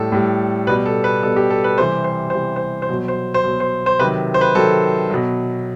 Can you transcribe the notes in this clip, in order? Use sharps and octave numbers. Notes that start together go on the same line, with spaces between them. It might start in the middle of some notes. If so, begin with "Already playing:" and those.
Already playing: A2 G3 A4
A2 G3
B2 G3 B4
A4
B4
B2 G3 A4
G4
A4
B4
C3 E3 G3 C5
C5
C3 E3 G3 C5
C5
C5
B2 F#3
C5
C5
B2 F#3
C5
C5
C3 D#3 F#3 B4
C5
B4
C3 D#3 F#3 A4
B2 F#3